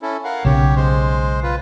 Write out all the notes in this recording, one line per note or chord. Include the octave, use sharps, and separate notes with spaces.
C#4 E4 A4
A#4 F5 F#5
B1 C#3 G4 C#5
G#3 C5
F4 B4